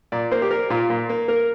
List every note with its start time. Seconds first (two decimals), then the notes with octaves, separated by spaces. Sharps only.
0.12 A#2 D5
0.31 A#3 C5
0.42 G4
0.51 A#3 A#4
0.70 A#2 F4
0.90 A#2
1.10 A#3
1.28 A#3 A#4